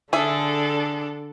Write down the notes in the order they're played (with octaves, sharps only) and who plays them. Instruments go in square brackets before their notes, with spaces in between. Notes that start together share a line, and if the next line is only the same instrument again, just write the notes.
[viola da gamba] D3 [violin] D4 A4 [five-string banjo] G#4 E5